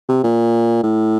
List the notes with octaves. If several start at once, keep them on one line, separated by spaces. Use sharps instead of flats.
C3
A#2
A2